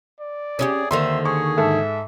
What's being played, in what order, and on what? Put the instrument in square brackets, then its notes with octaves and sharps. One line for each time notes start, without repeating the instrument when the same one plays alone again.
[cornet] D5
[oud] C#4 E4 G4 [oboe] G#4
[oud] D#2 D3 D#3 [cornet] C5 [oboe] E5 [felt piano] C6
[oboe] G#4 [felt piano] C#6
[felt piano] G#2 A4 [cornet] E5